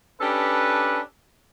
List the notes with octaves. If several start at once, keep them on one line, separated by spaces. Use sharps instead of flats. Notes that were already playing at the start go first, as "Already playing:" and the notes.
C#4 D4 G4 A4 B4